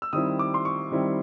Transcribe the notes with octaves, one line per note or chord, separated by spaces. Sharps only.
E6
D#3 G3 C4 E4 D#6
D6
C6
C#6
D#3 G3 C4 E4